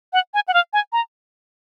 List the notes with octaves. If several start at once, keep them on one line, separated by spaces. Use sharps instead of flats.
F#5
G#5
F#5
F5
G#5
A#5